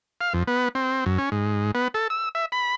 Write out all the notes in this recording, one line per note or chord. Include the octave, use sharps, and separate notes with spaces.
F5
F2
B3
C4
F#2
C#4
G#2
B3
A4
E6
E5
B5